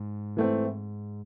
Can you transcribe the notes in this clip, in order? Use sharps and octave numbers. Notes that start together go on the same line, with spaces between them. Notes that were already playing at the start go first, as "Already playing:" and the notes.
Already playing: G#2
E3 A3 C4